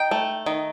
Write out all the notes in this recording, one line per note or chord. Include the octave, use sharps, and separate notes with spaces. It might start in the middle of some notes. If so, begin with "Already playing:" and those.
Already playing: D#4 G5
A3
D#3